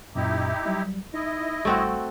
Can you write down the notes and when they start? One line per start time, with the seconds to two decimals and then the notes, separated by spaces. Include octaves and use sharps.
0.15 F#2 A#2 D#4 E4 G4
0.66 F#3 G3
1.14 D#4 E4 D#5
1.65 A1 G3 A3 C4 F#4